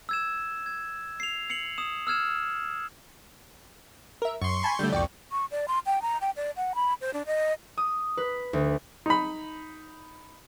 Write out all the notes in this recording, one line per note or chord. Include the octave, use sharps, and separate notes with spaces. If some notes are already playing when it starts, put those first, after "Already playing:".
E6 G#6 E7
G#6
C7 F7
C7 C#7 F7 F#7
D#6 E7
E6 F6 G#6 E7
A#4 E5
F#2 C6 C#6
G#5 A5 B5
D3 G3 A3 G6
C2 F2 D5 G5 C#6
C#6
D5
C6
G5
A#5
G5
D5
F#5
B5
C5
D4
D#5
D#6
B4
D2
D#4 B5